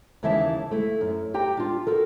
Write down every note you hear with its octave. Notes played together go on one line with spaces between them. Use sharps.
D#2 C#3 E3 E4 E5 A5
A3 E4
F#2
G4 G5 A#5
D4 F4
F#4 A4 A#4